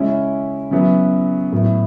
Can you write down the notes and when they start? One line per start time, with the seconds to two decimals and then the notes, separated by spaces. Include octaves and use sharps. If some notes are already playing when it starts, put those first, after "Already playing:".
Already playing: C#3 G#3 C#4 E4
0.71 C#3 F#3 B3 E4
1.53 A2 F#3 B3 E4